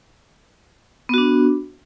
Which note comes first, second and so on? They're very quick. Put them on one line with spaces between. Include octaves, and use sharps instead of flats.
B3 F#4 D4